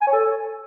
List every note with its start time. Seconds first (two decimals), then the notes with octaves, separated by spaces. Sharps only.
0.02 G#5
0.07 C#5
0.13 A4